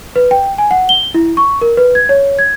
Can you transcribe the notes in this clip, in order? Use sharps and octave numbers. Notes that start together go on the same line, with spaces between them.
B4
G5
G#5
F#5
G7
E4
C#6
A#4
B4
G#6
C#5
G#6